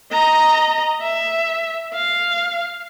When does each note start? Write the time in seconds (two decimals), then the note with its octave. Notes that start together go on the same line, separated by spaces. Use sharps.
0.13 D#5 A#5
1.02 E5
1.94 F5